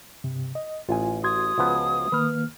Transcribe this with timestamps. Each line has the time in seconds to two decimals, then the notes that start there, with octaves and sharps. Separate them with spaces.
0.24 G2 C3
0.55 D#5
0.89 A1 F4 G#5
1.24 F#4 C6 D#6 G#6
1.58 C#2 F3 B3
2.12 D#3 A#3 B4 F6